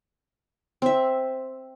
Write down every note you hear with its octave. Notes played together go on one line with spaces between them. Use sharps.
C4 E5